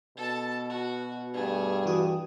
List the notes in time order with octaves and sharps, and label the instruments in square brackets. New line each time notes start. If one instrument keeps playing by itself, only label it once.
[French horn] B2 [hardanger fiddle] A4 A5
[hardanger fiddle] F#4
[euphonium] G2 [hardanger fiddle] A3 G#4
[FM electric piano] E3 F#4 D#6